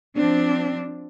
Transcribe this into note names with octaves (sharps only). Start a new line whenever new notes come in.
F3 C4 D4